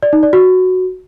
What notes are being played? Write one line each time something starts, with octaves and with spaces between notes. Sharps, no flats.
D5
D#4
D5
F#4